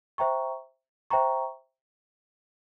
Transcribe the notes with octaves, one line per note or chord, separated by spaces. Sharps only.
C5 E5 G5 A#5 C#6
C5 E5 G5 A#5 C#6